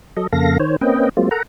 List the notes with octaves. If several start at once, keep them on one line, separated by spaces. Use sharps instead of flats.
F#3 A4 D#5
F2 C#3 A#3 A4 F5 A#6
D#3 C5 C#5
A#3 C4 C#4 B4 D#5 G5
F#3 G#3 A#3 C4 F4
A4 A#4 F#5 A#5